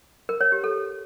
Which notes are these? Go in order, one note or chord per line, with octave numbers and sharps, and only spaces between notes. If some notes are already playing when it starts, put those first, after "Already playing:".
A#4
C#5
G4
A4